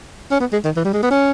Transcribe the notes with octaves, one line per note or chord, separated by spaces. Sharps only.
C#4
B3
G#3
D#3
E3
G3
G#3
B3
C#4